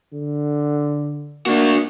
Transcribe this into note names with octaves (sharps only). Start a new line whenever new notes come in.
D3
A#3 D4 F#4